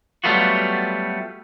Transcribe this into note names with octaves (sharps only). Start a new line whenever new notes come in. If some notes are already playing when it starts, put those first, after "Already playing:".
F#3 G3 A3 B3 F4 F#4